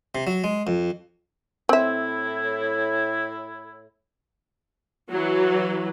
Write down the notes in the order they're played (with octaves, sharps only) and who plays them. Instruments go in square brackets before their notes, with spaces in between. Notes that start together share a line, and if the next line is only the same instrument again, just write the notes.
[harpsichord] C3
F#3
G#3
F2
[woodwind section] A2 E4 [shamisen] C4 E5
[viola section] E3 F#3